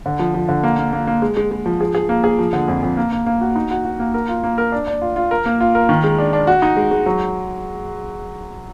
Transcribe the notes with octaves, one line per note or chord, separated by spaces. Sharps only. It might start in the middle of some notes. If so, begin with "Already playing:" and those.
D3
F3
F3
D3
A#3
A#3
A#3
A#3
G#3
G#3
G#3
F3
G#4
G#4
A#3
G#4
F3
D3
F2
F2
A#3
A#3
A#3
F#4
D#4
F#4
F#4
A#3
A#4
F4
A#3
A#4
D4
D4
F4
F4
A#4
A#3
F4
A#4
D#3
G#3
D4
D4
F#4
D#4
G#3
G#3
F#3